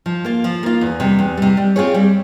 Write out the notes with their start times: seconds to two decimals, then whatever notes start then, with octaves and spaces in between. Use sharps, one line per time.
0.06 F3
0.24 A#3 F4
0.44 F3
0.63 A#3 F4
0.81 E2
1.00 C3 G3
1.19 E2
1.37 C3 G3
1.57 G3
1.76 C4 F4 G#4 C#5
1.94 G3